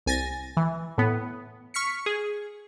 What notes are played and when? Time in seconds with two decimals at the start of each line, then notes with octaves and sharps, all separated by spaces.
0.06 C2 G#5 A6 A#6
0.57 E3
0.98 A2 B3
1.74 C#6 F6 B6 C#7
2.06 G#4